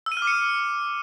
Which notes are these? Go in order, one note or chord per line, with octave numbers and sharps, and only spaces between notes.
E6
D#7
F6
D6
C#7